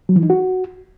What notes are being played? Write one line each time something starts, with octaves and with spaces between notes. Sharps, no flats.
F#3
E3
D#4
F#4